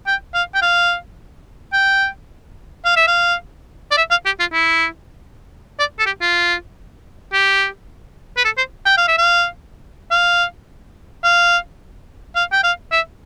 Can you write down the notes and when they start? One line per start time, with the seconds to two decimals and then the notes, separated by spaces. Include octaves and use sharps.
0.07 G5
0.34 F5
0.55 G5
0.62 F5
1.73 G5
2.85 F5
2.96 E5
3.08 F5
3.91 D5
3.98 E5
4.11 F5
4.26 G4
4.40 F4
4.53 E4
5.79 D5
5.99 A4
6.06 G4
6.21 F4
7.33 G4
8.37 B4
8.45 A4
8.58 C5
8.86 G5
8.98 F5
9.08 E5
9.18 F5
10.11 F5
11.24 F5
12.35 F5
12.53 G5
12.64 F5
12.92 E5